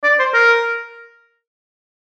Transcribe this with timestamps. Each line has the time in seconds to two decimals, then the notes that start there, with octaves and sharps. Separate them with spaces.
0.04 D5
0.19 C5
0.34 A#4